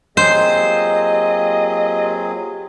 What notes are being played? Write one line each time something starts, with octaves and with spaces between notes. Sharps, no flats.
F#3 A#3 C4 F4 G4 G#4 C5 D#5